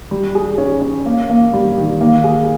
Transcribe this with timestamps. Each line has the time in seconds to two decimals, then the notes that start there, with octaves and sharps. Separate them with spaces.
0.11 G3
0.35 G#4
0.58 C#4
0.82 C#4
1.06 A#3
1.30 A#3
1.54 G3
1.77 D#3
2.01 A#3
2.24 G#4